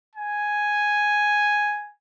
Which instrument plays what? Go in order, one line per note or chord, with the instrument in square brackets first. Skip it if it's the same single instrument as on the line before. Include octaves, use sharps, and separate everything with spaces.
[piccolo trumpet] G#5